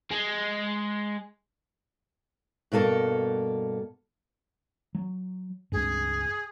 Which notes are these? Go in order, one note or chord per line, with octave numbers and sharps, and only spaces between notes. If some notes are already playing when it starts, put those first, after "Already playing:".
G#3
G2 B2 A#3 A4
F#3
C#2 G2 G#4